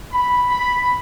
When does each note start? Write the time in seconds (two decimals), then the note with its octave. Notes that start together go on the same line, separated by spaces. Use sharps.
0.12 B5
0.51 B5